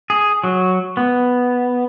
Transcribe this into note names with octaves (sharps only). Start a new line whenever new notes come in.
G#4
F#3
B3